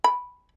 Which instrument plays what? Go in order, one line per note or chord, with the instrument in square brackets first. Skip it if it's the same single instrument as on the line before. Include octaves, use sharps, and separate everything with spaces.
[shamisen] B5